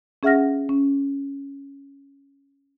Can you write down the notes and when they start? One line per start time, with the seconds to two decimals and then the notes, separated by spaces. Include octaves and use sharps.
0.23 C#4 G#4 E5 F#5 F6 A#6
0.69 C#4